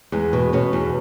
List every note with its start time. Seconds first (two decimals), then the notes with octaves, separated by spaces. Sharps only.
0.12 E2 G#3
0.33 B2
0.53 B2 C#4
0.73 E2